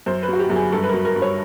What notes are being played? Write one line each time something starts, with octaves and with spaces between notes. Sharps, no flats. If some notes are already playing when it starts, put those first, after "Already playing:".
F#2 C5
B4
F#3 F#4
G4
F#2 G4
G#4
G2 A4
B4
A#4
F#3
A#4
G2
C#5